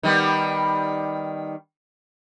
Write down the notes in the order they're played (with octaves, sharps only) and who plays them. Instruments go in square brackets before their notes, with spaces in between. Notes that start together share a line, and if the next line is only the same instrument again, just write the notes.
[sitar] D#3 G3 B3